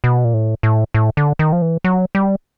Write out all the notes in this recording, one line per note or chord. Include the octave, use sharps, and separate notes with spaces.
B2
A#2
A2
A2
A2
D3
D#3
F3
E3
F#3
G3